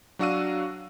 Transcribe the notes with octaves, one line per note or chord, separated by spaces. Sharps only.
F#3 D4 F#4 F5 E6 D#7